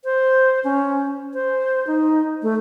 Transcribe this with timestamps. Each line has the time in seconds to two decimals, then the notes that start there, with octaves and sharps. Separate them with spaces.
0.04 C5
0.64 C#4
1.34 C5
1.87 D#4
2.43 A3